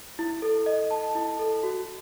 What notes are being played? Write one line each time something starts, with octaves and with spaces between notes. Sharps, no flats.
E4
A4
D#5
A5
E4
A4
F#4